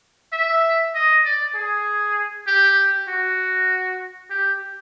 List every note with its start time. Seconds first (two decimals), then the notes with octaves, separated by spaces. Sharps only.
0.32 E5
0.95 D#5
1.25 D5
1.55 G#4
2.47 G4
3.08 F#4
4.30 G4